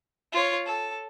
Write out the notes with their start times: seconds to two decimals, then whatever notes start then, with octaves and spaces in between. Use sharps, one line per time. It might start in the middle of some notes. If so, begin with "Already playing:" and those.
0.32 F4 C#5
0.66 A4